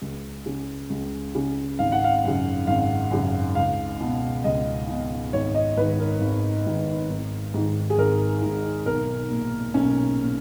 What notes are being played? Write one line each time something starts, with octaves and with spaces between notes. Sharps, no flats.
C#2
C#3
C#2
C#3
G#1 F5
F#5
F5
F#2 C#3
G#1 F5
F#2 C#3
C#2 F5
B2
C#2 D#5
B2
G#1 C#5
D#5
G#2 D#3 B4
A#4
G#1
G#2 D#3
G#1
G#2 D#3
G#4
G#1 A#4
G#2 D#3
B1 A#4
A#2
B1 C#4
A#2